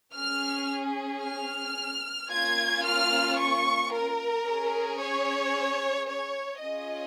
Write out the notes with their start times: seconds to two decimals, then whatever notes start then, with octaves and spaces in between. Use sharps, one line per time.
0.15 C#4 G#4 F6
1.23 F6
2.31 A#3 C#4 F4 G#6
2.85 F6
3.39 C#6
3.92 A#4
4.46 C#4 G#4
5.00 C#5
6.08 C#5
6.62 C#4 F4 G#4 D#5